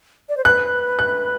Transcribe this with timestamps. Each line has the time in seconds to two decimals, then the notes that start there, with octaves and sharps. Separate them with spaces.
0.29 D5
0.37 C5
0.45 B4 F#6
0.99 F#6